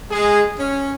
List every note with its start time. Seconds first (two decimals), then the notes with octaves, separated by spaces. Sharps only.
0.11 G#3 G#4
0.60 C#4